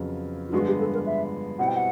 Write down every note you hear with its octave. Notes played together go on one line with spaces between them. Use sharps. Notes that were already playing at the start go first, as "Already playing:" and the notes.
Already playing: F2 C#3 F#3 B3
F4
G2 D3 F3 G#3 B3 F#4
G4
A4
A#4
E5
B2 G3 C4 E4 F#5
G5
F#5